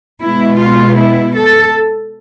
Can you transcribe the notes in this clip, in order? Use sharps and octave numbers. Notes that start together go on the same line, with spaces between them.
B2 G#3 B3 E4
F4
E4
A4